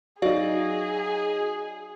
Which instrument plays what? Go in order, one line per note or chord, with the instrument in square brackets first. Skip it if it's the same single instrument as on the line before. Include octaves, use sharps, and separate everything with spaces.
[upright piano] F#3 D#4 [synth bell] F#4 D5 F5 [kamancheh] G#4